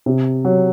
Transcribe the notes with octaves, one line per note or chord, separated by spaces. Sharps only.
C3
F#3